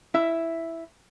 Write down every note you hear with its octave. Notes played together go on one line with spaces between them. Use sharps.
E4 E5